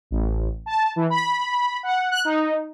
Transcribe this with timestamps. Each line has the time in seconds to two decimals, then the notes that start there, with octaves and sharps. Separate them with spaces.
0.11 A1
0.66 A5
0.96 E3
1.10 B5
1.83 F#5
2.11 F#6
2.25 D#4